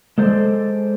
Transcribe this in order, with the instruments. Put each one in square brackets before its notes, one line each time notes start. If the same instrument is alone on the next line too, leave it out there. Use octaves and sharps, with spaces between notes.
[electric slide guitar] G#3 A4 C5 D5